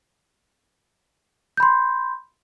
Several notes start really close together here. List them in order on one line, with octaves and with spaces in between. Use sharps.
G6 B5 C6